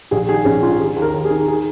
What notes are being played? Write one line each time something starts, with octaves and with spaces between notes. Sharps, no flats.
A#1 G#4
D#3 G#4
A#1 C#4
G#2 F4
D#3 G#4
D#2
A#4
D#2
G#4
D#3
G#4